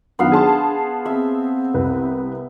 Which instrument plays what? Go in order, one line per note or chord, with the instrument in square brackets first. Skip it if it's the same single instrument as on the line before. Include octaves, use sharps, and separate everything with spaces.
[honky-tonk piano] D#3 F#3 [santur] B3 F5 [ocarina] D4
[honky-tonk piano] G#4 A5 C6
[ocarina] C4 [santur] E5
[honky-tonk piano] C2 B4